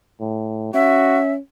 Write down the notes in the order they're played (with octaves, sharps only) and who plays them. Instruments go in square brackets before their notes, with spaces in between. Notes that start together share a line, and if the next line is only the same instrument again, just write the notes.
[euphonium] A2
[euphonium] C#4 [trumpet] F#4 [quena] E5